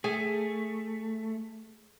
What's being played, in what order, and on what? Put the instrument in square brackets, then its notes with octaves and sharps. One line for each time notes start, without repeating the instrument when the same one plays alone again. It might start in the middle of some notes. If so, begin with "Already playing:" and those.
[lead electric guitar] A3 [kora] G#4